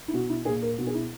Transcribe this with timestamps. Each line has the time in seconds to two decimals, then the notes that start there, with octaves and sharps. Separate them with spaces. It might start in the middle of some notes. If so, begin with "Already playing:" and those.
0.08 E4
0.13 B2 F#4
0.29 E4
0.45 A#2 G#4
0.62 A#4
0.78 B2 F#4
0.87 G#4
0.95 E4